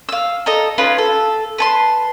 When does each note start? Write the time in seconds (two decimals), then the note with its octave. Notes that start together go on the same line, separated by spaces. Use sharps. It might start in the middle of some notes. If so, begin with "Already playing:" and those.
0.09 F5 E6
0.46 A4 D#5 A5 A#5
0.78 C#4 D#4 F4 B4
0.98 A4
1.58 B4 A5 C6